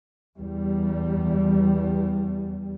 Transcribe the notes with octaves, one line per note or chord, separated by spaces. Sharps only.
E2 G3